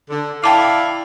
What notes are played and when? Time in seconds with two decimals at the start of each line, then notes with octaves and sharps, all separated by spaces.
0.10 D3
0.44 E4 D5 F5 G5 A5 D6